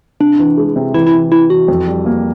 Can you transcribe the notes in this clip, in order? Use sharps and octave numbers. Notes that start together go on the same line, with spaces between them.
C3 D4
E3
G#3
C3
E3 E4
E4
E3
E3 E4
E3 F#4
F2
G3
A#3